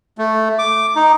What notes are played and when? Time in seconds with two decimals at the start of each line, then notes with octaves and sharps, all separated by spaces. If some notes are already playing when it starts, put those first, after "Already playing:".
0.18 A3
0.59 D6
0.96 D#4